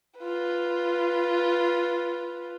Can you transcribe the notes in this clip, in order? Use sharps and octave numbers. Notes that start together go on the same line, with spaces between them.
F4 B4